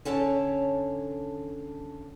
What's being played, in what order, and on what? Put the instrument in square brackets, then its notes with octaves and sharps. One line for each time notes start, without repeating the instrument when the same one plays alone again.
[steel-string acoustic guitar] D3 C#4 A4 C#5 A5